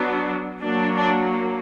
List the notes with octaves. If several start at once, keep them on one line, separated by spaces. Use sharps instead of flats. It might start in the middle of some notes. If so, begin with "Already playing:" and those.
Already playing: F#3 B3 D4
F#3 A#3 D4
D4